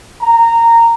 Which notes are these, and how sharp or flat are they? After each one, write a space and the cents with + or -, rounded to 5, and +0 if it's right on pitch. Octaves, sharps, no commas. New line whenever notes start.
A#5 -15